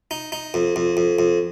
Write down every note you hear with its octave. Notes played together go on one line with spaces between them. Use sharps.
D#4
D#4
F2
F2
F2
F2